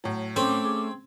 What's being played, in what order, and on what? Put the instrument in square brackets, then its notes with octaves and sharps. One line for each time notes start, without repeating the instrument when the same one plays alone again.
[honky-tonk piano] A2 F#3
[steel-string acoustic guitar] A3 C#4 C5 [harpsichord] C4 [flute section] D6
[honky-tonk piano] G#4